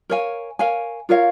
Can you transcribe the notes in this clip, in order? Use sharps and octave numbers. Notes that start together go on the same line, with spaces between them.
A#4 C#5 F5 G#5
A#4 C#5 F5 G#5
F4 A#4 C#5 F5